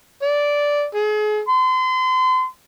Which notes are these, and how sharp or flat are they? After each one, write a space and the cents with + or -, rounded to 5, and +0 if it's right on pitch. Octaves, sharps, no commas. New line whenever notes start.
D5 -10
G#4 +35
C6 -35